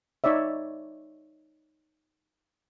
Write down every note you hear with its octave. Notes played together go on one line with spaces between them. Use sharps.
D#4 C#5 D5 E5